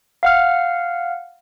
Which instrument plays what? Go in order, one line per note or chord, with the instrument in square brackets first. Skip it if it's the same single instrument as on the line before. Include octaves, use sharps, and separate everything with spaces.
[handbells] F5 F#5 F6